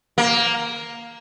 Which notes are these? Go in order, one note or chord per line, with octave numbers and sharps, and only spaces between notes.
A#3